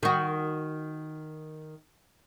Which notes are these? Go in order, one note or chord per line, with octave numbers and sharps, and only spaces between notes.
D#3 F#4